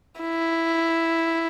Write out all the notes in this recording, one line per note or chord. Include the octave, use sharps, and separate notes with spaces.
E4